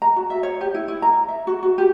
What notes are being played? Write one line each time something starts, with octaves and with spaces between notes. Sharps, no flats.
A#5
F#4
E5
C#5
G4
E4
E4
A#5
E5
F#4
F#4
G4